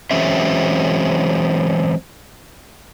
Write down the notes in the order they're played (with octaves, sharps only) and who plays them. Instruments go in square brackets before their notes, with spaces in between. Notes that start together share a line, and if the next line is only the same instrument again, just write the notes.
[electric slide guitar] E3 F#3 G#3 C4 C#4 E5